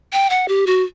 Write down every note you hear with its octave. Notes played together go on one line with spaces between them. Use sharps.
G5
F#5
G4
F#4